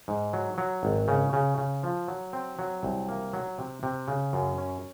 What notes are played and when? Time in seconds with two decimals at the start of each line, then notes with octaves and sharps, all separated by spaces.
0.08 G#2
0.33 F#3
0.58 F#3
0.83 G#1
1.08 C#3
1.33 C#3
1.58 C#3
1.83 F3
2.08 F#3
2.33 C4
2.59 F#3
2.83 C2
3.08 A#3
3.33 F#3
3.58 C3
3.83 C3
4.08 C#3
4.33 F#2
4.58 C#4